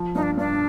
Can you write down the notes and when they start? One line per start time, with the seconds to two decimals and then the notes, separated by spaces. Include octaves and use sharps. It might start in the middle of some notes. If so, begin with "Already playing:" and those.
Already playing: F3
0.15 G2 D#4
0.23 D4
0.37 G2 D4